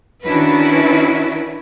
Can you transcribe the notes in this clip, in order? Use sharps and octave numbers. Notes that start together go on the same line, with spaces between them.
D#3 C#4 D4 E4 F#4 B4